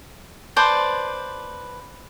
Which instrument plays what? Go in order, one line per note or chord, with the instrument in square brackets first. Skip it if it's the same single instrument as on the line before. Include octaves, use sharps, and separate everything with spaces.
[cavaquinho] B4 C5 D5 A5